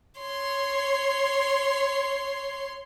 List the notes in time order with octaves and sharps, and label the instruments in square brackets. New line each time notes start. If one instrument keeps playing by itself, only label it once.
[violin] C#5 C6